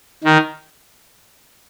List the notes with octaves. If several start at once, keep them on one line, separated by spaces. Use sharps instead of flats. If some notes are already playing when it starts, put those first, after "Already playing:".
D#3